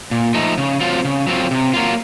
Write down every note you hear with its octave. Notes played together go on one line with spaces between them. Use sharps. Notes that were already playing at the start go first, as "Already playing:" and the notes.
A#2
F3 A3 D#4
C#3
F#3 C4 F4
C#3
F#3 C4 F4
C3
F#3 A#3 F4